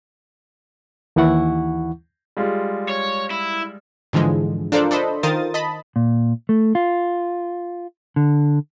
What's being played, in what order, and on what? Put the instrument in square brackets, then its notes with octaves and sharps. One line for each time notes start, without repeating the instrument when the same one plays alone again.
[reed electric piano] D#2 E3 E4 F#5 C#6
[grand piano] G3 G#3 F4
[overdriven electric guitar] C#5
E4
[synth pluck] G#2 D3 E3 F3 G#3
D4 F4 A4 A#4 C5 D5
D4 A4 C5 D#5 B5
D#3 F4 A#4 C5 D#6 A6
D#5 A5 B5
[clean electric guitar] A#2
A3
F4
D3